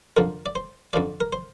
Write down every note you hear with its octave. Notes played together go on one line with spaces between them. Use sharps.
F2 D3 F3 A#4
D5
C5
F2 D3 F3 D5
A#4
C5